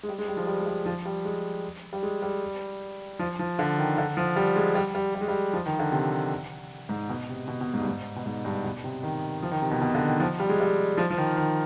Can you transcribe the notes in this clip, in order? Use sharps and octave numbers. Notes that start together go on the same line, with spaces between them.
G#3
G3
G#3
G3
F3
G3
G#3
G3
F3
G3
G#3
G3
G#3
G3
F3
F3
D3
D#3
D3
F3
G3
G#3
G3
G3
G3
G#3
G3
F3
D#3
D3
C3
G#2
B2
C3
B2
B2
G#2
G2
G#2
B2
G#2
G2
B2
C3
D#3
F3
D#3
C3
B2
B2
D3
D#3
F3
G3
G#3
G3
F3
F3
D#3
D#3